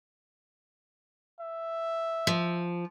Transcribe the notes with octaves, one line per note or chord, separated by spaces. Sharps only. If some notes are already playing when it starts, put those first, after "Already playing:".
E5
F3